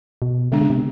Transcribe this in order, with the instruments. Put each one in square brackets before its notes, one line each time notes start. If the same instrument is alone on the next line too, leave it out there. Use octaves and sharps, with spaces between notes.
[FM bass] B2
[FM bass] D3 [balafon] G#3 B3 D4
[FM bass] C#3
C3